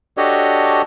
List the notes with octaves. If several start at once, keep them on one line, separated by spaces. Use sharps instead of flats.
D4 F#4 G4 A4 C#5 D#5